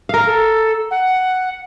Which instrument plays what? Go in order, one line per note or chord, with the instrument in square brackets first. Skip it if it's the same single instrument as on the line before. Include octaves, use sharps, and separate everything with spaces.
[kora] A#4 F5
[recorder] A4
F#5